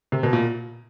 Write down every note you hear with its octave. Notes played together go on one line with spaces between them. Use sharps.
C3
B2
A#2